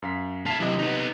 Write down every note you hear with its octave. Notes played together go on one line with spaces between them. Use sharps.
F#2 F5 B6
F4 E5 A5 B6 C7
C3 F#3 E4 D#5
B3 D#4